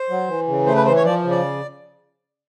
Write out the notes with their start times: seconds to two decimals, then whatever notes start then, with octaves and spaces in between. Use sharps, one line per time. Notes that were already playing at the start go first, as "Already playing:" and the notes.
Already playing: C5
0.10 F#3
0.28 E3
0.48 C#3
0.66 A3 C5
0.76 B4
0.85 E3 C5
0.96 C#5
1.04 F3 D5
1.24 C#3
1.31 D5